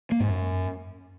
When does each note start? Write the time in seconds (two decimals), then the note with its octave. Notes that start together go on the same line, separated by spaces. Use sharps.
0.12 A#3
0.20 G#2
0.29 F#2